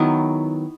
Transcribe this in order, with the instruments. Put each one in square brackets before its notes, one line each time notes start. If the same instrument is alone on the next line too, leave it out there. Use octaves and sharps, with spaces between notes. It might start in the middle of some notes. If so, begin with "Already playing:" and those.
Already playing: [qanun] D#3 F#3 B3 E4